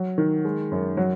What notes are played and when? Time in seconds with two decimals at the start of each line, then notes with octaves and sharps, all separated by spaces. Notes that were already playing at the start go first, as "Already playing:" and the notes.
Already playing: F#3
0.18 D#3
0.45 G#3
0.72 F#2
0.97 F#3